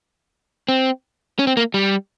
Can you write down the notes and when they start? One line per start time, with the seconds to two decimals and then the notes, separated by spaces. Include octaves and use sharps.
0.68 C4
1.39 C#4
1.47 C4
1.57 A#3
1.74 G3